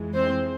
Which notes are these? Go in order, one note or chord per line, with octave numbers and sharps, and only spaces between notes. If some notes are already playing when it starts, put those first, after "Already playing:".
Already playing: F2 E3 G#3
C4 C5